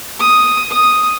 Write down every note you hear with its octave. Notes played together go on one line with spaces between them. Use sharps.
D#6
D#6